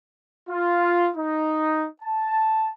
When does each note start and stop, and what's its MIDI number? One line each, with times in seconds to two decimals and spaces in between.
0.50 1.09 65
1.15 1.87 63
2.02 2.70 81